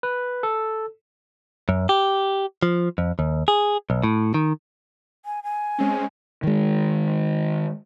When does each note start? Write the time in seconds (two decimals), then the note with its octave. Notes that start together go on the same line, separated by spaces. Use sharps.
0.03 B4
0.43 A4
1.69 F#2
1.89 G4
2.63 F3
2.98 F2
3.19 D#2
3.48 G#4
3.90 B1
4.04 A2
4.34 D#3
5.25 G#5
5.43 G#5
5.78 G#3 C4 C#4
6.43 D#3 G#3